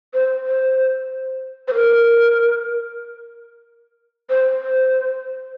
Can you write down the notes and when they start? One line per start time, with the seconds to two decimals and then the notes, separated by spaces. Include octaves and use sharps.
0.14 C5
0.46 C5
1.68 C5
1.74 A#4
4.29 C5
4.61 C5